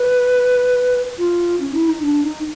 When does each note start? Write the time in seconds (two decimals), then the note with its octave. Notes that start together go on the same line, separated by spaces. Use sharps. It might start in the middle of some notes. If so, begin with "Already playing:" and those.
Already playing: B4
1.18 F4
1.60 C#4
1.74 E4
1.88 D#4
2.02 D4
2.23 D#4